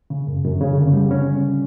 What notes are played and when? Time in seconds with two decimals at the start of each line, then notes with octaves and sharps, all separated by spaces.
0.10 C#3
0.27 F#2
0.45 F#2
0.61 C#3
0.78 D3
0.93 G3
1.11 C#4